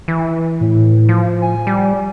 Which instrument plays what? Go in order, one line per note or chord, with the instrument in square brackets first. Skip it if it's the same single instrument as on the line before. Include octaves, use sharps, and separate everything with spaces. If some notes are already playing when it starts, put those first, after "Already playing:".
[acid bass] E3
[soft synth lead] A2
[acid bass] F3
[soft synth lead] G#5
[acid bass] G3